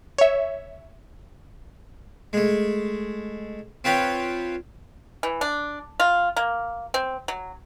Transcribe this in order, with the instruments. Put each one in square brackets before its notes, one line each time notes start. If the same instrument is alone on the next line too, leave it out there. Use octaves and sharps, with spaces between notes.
[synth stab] C#5 E5
[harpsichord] G#3 A3
C4 F4 B4 C#5 G5
[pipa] E3
D4
F4
A#3
C4
F#3